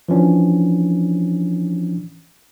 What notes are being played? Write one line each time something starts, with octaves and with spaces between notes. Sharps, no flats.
E3 F3 C#4 D4